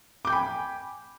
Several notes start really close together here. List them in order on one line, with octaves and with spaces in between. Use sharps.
D6 G6 G5 B5 G#5